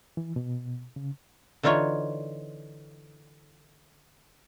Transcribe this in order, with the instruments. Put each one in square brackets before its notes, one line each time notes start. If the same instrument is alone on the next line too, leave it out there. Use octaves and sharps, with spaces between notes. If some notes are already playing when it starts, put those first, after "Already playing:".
[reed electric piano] E3
B2
C#3
[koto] D3 E3 D#4 F4 C#5